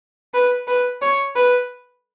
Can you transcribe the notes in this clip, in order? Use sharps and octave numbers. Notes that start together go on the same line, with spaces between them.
B4
B4
C#5
B4